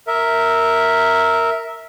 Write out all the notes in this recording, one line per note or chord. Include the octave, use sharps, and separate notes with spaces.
A#4 E5